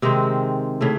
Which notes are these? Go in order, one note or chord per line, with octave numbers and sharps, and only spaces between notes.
C3 D#3 G#3 C4
C#3 E3 A3